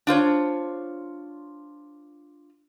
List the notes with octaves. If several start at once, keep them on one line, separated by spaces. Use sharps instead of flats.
D4 F4 C5 C#5